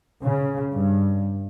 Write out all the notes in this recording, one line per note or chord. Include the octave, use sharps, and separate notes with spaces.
C#3
G2